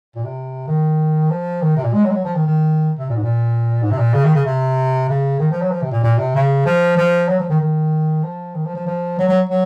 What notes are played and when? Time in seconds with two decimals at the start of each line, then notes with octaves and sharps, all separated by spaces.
0.16 A#2
0.25 C3
0.68 D#3
1.30 F3
1.62 D#3
1.77 C3
1.84 A#2
1.93 G#3
2.04 F#3
2.10 G#3
2.14 F#3
2.25 F3
2.35 D#3
2.46 D#3
2.99 C3
3.10 A#2
3.16 G#2
3.23 A#2
3.83 G#2
3.91 C3
3.99 A#2
4.14 C#3
4.25 D#3
4.35 C#3
4.45 C3
5.09 C#3
5.40 D#3
5.51 F3
5.62 F#3
5.71 F3
5.82 C3
5.92 A#2
6.03 A#2
6.18 C3
6.35 C#3
6.66 F3
6.97 F3
7.29 F#3
7.40 F3
7.50 D#3
7.61 D#3
8.24 F3
8.55 D#3
8.65 F3
8.76 F3
8.87 F3
9.19 F#3
9.29 F#3
9.50 F#3